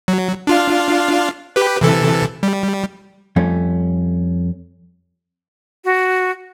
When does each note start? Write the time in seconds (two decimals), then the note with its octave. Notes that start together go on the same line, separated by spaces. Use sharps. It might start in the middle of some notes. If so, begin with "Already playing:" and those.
0.08 F#3
0.47 D4 F4 F5
1.56 G4 B4
1.81 C3 E3 A4
2.43 G3
3.36 F2 G3 A3 C#4
5.85 F#4